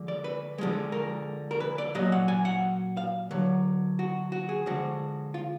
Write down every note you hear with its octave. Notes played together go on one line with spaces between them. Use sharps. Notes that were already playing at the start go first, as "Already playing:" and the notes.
Already playing: D3 F3 G#3
D5
B4
D3 F3 G#3
A#4
A#4
B4
D5
A#2 F#3 D#5
F#5
G#5
F#5
F5
D3 F#3
F#4
F#4
G#4
D3 F3 G#3 F#4
F4